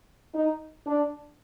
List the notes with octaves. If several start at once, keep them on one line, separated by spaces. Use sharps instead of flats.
D#4
D4